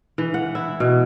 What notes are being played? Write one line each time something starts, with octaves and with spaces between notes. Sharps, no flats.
E3
F#5
E4
B2